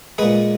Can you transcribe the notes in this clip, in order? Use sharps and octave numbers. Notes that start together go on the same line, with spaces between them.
A#2 G#3 G#4 B4